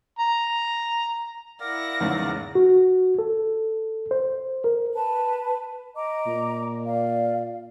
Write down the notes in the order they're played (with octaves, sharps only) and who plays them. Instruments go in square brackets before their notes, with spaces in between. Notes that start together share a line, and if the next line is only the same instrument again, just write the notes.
[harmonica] A#5
[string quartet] E4 F#5 A#6 [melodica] A#4 D5 F5
[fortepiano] E2 G#2 C#3
[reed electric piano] F#4
A4
C5
A#4
[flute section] B4 A5
D#5 A#5 D6
[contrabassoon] A#2
[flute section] D5 F5